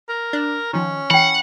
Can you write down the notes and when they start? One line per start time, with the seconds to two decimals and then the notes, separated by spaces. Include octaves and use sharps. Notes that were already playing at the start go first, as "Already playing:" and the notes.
0.09 A#4
0.33 D4
0.73 D#3 F3 C#4
1.11 E3 F#5 G5 B5